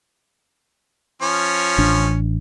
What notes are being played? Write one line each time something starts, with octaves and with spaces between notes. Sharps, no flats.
F3 C#4
A1 D4